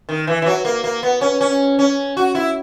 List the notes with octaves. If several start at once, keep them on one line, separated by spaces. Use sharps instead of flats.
D#3
E3
E3
F#3
A#3
A#3
B3
C#4
C#4
C#4
F#4
E4